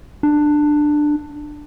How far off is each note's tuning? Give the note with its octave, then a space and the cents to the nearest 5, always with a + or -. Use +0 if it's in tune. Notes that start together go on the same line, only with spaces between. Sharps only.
D4 +15